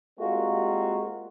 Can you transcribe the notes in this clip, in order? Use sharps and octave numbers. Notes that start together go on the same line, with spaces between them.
G3 G#3 A#3 C4 F4 F#4